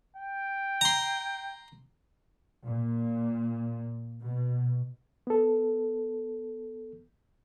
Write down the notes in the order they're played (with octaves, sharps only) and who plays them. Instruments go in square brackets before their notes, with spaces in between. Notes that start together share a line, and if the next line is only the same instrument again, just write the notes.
[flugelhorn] G5
[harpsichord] A#5 C6
[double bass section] A#2
B2
[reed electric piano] B3 A4